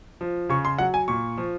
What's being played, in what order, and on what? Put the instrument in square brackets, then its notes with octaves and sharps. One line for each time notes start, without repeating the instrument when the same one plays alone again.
[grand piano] F3
C#3 C#6
C6
F#3 F#5
G#5
A#2 C#6
F3